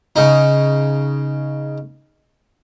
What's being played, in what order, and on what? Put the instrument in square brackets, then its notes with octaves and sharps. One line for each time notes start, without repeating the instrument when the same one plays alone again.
[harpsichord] C#3 D#4